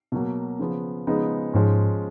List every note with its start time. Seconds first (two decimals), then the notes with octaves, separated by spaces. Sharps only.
0.12 B2 F#3 A#3
0.59 C#3 F3 B3
1.07 C#3 F3 G#3 B3 D#4
1.54 G#2 F3 G#3 C#4